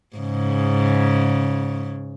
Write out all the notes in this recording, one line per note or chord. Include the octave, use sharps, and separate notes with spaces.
G#2 C#3